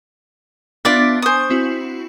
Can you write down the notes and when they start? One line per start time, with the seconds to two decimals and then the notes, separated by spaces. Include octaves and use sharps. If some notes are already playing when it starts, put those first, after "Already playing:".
0.85 B3 D4 F4 D5 E5
1.22 C5 G#5 C#6 D#6
1.50 C4 E4 F#4